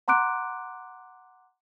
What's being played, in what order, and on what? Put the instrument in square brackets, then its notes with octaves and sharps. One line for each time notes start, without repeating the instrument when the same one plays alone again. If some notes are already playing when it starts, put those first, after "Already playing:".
[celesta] F#5 A#5 C6 D6 F#6 D7